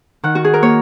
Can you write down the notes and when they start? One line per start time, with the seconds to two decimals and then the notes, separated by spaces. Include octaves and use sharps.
0.23 D#3 F#5
0.35 F#4
0.44 G#4
0.54 A#4
0.62 A#3 C#5